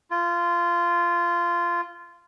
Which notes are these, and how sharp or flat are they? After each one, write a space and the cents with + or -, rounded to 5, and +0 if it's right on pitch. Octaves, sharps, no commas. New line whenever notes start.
F4 -15